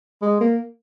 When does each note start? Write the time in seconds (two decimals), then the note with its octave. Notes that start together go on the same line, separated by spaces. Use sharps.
0.22 G#3
0.40 A#3